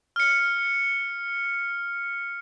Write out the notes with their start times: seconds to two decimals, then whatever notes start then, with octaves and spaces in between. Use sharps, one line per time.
0.16 F6 C#7